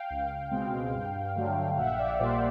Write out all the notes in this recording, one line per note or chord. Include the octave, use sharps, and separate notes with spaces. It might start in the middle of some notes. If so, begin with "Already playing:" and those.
Already playing: F5 G5
C#2
B2 G#3 C4
G2
D3 F#3 A3
A#1 E5 F#5
D5 E5
A#2 G3 A#3 C5 D5